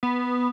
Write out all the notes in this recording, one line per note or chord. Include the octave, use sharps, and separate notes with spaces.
B3